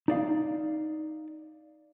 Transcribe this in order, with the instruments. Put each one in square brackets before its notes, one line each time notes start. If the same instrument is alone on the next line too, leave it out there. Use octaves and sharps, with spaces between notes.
[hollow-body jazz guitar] D#4 D5 F5